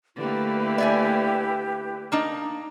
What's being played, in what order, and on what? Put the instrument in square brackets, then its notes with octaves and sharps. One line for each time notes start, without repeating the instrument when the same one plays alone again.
[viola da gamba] D3 A3 A#3 [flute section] E4 G4 B4
[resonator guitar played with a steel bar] D5 E5 G#5
A#3 D4 D#4